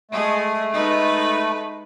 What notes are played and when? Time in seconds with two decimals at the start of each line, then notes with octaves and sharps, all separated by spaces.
0.11 G#3 A3 G#4
0.71 G#3 D#4 B4